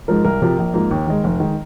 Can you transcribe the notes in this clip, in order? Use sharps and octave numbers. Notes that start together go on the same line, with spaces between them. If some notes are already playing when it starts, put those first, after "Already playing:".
G#2 F3 G#3 A#4
C2 A#4
C3 F3
A#1
G#2 F3 A#3
D#2
D#3 G#3
F1
D#3 G#3